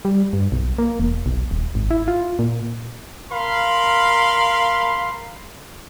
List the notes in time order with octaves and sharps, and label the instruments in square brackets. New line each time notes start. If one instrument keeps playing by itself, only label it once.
[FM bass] G3
G2
B1
A#3
E1
B1
D#1
G#1
E4
F4
A#2
[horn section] A#4 F5 B5 C6